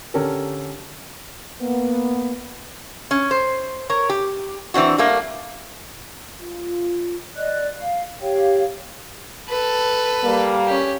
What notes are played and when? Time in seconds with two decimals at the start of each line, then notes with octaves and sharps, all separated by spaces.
0.14 D3 C#4 G4 A4 A#4
1.62 A#3 B3
3.11 C#4
3.31 C5
3.90 A#4 C#5
4.09 G4
4.74 E3 C4 D4 F#4
4.98 G3 A3 A#3 D4
6.40 F4
7.35 D5 D#5 F#6
7.75 F5
8.21 G4 C#5 F5 G5
9.49 A4 B4
10.24 G3 A#3
10.66 C#4 G4